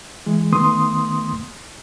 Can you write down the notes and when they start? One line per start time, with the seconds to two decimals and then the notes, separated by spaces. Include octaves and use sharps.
0.26 E3 G#3
0.52 D#3 A3 B3 C6 D#6